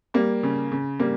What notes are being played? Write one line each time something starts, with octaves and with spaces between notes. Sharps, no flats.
G3 A#3
C#3
C#3
G3 A#3